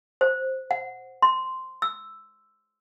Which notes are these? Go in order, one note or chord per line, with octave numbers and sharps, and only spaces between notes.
C5
F#5
C6
E6